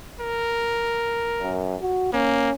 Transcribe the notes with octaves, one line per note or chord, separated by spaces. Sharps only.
A#4
F#2
F#4
A#3 C#4